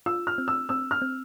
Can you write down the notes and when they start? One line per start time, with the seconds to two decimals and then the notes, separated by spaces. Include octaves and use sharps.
0.06 F4 E6
0.27 F6
0.38 C4
0.48 E6
0.69 C4 E6
0.91 F6
1.02 C4